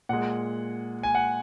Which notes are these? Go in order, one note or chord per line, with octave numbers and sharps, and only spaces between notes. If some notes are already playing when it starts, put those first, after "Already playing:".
A#2 G#3 F#5
G#5
F#5